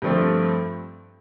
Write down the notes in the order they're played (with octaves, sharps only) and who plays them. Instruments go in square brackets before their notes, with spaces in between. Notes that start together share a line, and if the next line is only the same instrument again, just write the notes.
[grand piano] G2 F3 A3 C4